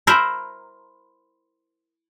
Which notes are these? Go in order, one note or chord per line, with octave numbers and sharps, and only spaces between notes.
E4 A#4 C5